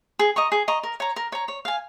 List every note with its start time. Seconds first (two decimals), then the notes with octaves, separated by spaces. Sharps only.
0.19 G#4
0.36 D#5 A#5 C#6
0.52 G#4
0.68 D#5 A#5 C#6
0.83 A#4
1.00 C#5 A#5
1.16 A#4
1.32 C#5 A#5
1.48 C#5
1.65 F5 G#5